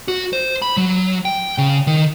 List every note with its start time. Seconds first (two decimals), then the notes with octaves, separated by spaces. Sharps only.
0.08 F#4
0.33 C5
0.62 B5
0.77 F#3
1.25 G5
1.58 C#3
1.87 D#3